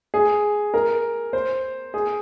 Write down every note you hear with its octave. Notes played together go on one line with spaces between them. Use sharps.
G#4
A#4
C5
G#4